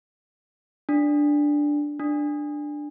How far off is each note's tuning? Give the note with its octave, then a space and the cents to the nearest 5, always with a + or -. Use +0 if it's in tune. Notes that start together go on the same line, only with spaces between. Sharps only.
D4 +0
D4 +10